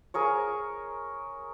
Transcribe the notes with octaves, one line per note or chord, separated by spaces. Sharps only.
G#4 A#4 C#5